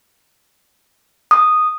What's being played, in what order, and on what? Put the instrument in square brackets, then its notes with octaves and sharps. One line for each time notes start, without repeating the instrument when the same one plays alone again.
[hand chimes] D#6